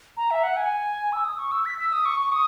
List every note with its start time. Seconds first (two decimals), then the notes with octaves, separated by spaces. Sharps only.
0.17 A#5
0.31 E5
0.43 F#5
0.57 G#5
1.13 E6
1.25 D#6
1.38 C#6
1.51 E6
1.65 B6
1.79 E6
1.92 D#6
2.05 C#6
2.20 C#6
2.32 D#6